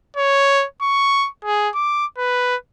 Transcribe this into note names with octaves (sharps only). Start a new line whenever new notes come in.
C#5
C#6
G#4
D6
B4